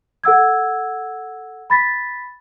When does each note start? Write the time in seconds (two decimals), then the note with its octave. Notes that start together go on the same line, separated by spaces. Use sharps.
0.24 A4 F#5 E6 G#6
1.70 B5 A6 B6